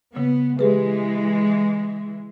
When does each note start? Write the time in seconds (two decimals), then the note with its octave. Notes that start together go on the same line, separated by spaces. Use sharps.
0.17 C#3 B3
0.59 E3 G#3 G4 G#4 B4